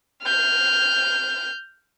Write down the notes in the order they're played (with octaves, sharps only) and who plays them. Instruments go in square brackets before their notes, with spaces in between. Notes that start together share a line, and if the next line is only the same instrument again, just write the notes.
[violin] F6 G6